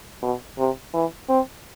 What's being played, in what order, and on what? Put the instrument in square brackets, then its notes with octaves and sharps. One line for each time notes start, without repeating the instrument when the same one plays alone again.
[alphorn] B2
C3
E3
C4